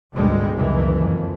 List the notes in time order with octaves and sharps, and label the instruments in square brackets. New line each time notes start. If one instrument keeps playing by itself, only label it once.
[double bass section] G#1 D2 B2 D3 G3 G#3
F#1 C#2 D#3 E3
F2